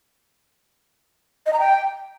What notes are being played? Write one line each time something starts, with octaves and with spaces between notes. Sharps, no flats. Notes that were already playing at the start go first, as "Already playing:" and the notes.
D#5
A#5
G5